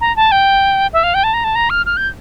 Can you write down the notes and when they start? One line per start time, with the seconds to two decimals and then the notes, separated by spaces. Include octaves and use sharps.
0.01 A#5
0.16 A5
0.32 G5
0.93 E5
1.03 F5
1.14 G5
1.24 A5
1.34 A#5
1.44 A5
1.55 A#5
1.70 F6
1.86 F6
1.97 G6